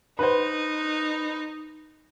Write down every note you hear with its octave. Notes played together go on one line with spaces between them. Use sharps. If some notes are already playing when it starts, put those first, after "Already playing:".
D#4 B4 C5